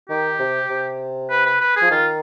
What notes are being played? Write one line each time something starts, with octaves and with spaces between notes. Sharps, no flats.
D#3 G4
C3
C3
B4
B4
B4
G#4
F3
D#3 F4